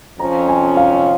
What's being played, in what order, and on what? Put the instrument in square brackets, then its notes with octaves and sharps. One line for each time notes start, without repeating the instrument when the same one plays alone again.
[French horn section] F2 F3 C#4 [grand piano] A#5
[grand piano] G#5
F5